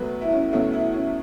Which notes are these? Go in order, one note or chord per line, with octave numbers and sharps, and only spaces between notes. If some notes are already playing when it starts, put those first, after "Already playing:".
Already playing: E2 B2 F#3 A3 B4
E4
C#4
E2 B2 F#3 A3 C#4
E4
C#4